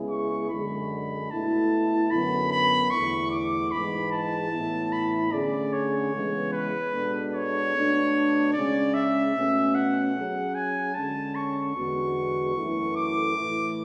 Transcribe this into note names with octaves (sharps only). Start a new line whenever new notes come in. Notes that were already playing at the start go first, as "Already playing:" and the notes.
Already playing: C#3 G#3 B3 E4 G#4
C#6
F#2 D3 G#3 D4 B5
B2 A3 E4 A4 A5
F#2 D3 F#3 B3 B5
B5
E2 D3 A3 E4 C#6
D6
G#2 E3 G#3 B5
A5
A2 E3 B3 E4
B5
D3 A3 C#4 G#4 D5
C#5
C#3 E3 G#3 B3
B4
B2 G#3 B3 D4 A4
C#5
B2 A3 D4 A4
C#3 G#3 C#4 D5
E5
B2 A3 C#4
F#5
F#3 C#4 G#4
G#5
D3 G#3 C#4 A5
C#6
E2 D3 G#3 B3 F#4
F#2 E3 A3 E4 A4
D6
A2 E3 A3 E4